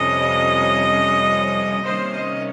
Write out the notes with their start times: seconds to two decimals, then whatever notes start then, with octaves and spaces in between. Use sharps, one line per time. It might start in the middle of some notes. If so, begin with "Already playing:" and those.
Already playing: F2 C3 G3 C#4 D#5
1.84 C3 D#3 G3 A#3 C#4 C5
2.13 D#5